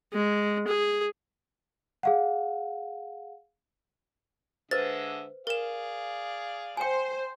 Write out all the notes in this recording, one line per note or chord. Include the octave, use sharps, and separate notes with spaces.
G#3
G#4
G#4 F5 F#5
D3 G#3 B4 C5 E5 A6
G#4 A#4 D5 F5 E7
C5 G5 G#5